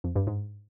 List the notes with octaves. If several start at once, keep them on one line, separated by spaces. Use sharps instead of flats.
F2
G2
G#2